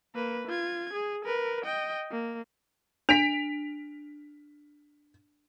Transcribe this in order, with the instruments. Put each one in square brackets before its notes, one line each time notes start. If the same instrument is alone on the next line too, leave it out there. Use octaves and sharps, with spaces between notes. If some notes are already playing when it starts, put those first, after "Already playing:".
[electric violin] A#3 B4
F4 G#6
G#4
A#4 B4
D#5 G5
A#3
[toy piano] D4 [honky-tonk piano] B6 D7 F7